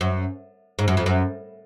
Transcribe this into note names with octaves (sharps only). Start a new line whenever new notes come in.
F#2
G#2
F#2
F2
F#2